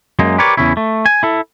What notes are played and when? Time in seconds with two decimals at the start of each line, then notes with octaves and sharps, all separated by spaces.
0.19 F#2 G#3 A#3
0.38 G4 A#4 B4 C#5 D5
0.57 E2 G2 C#3 C#4 E4
0.77 A3
1.06 G#5
1.23 E4 A4